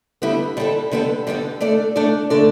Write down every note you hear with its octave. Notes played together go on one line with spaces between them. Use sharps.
D3 G3 B3 E4 A4
D3 G3 B3 E4 A4
D3 G3 B3 E4 A4
D3 G3 B3 E4 A4
D3 A3 D4 A4 D5
D3 A3 D4 A4 D5
D3 A3 D4 A4 D5